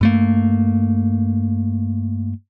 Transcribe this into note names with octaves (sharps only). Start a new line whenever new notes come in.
G2 A3 A#3